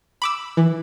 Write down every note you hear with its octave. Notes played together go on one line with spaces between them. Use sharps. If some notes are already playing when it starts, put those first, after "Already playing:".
B5 D6 E6
E3